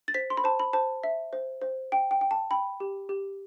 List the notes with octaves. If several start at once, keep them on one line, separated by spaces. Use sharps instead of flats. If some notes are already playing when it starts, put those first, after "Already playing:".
A6
C5 B6
C6
B5
C5 A5
B5
C5 A5
E5
C5
C5
G5
G5
G5
A5
G5 B5
G4
G4